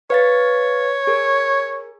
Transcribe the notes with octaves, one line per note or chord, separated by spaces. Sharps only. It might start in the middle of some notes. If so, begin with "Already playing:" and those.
B4 C#5 F5 A6
G#4 A#4